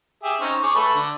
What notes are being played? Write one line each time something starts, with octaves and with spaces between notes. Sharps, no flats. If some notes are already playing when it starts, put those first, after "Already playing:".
G4 G#4 E5
C4 C#4 D#4
G#4 C#5 D6
A3 A4 B4
D3